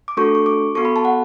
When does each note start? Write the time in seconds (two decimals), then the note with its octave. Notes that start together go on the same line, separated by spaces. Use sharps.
0.08 D6
0.17 A3 D4 F#4 A4 C#6
0.35 C#6
0.46 D6
0.75 B3 F#4 A4 C#6
0.85 B5
0.96 A5
1.05 F#5